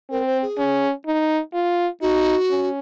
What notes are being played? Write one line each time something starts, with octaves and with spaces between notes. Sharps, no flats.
C4 A#4
C5
G#4
C#4
D#4
F4
D#4 F#4
C#4